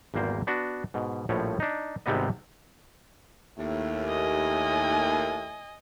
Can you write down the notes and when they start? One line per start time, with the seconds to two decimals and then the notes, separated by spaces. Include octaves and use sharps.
0.14 G#1 E2 G3 A#3 C5
0.47 B3 D4 F#4
0.94 G#2 B2
1.29 A#1 A2 F3 G3 C#5
1.60 D4 D#4
2.06 G#1 G#2 C3 G3 B3 D#5
3.58 D#2 A2
4.09 D#5 G#5